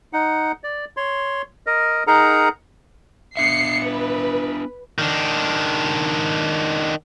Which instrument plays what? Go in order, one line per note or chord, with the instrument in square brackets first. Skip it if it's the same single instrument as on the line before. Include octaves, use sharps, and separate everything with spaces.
[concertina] D#4 F#5
D5
C#5 C6
A#4 D#5
D#4 G#4 A#4 F#5 A#5
[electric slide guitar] B3 D4 E5 [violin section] C7 C#7
[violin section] B4
[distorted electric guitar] D#3 D4